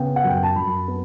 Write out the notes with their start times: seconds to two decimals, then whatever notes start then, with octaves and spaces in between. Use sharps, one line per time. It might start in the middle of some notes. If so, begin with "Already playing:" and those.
Already playing: C#3 B3 G5
0.16 F#5
0.24 F#2
0.29 G5
0.43 A5
0.56 F#2 B5
0.88 B3